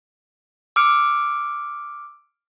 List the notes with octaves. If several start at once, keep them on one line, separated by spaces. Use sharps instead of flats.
D6 E6 F6 C#7 D7